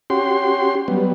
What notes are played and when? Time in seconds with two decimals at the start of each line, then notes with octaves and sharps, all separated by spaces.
0.10 C#4 F#4 G4 C6
0.88 F#3 G3 B3